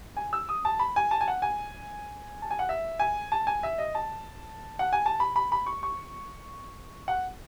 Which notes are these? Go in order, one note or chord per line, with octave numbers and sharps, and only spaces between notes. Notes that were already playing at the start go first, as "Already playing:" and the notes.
G#5
E6
D#6
A5
B5
G#5
A5
G#5
F#5
G#5
A5
G#5
F#5
E5
G#5
A5
G#5
E5
D#5
A5
F#5
G#5
A5
B5
B5
B5
C#6
C#6
F#5